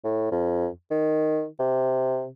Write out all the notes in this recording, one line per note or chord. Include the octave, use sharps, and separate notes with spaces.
A2
F2
D#3
C3